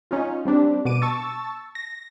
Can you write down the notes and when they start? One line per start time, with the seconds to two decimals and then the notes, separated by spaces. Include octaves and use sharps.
0.11 C#4 D#4 F4
0.45 G3 C4 D4 G4
0.85 B2 B3 D6 D7 D#7
1.02 A5 C#6 E6 A6
1.75 A#6